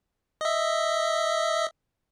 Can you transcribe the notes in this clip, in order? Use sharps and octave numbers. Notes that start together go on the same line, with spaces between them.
D#5 E5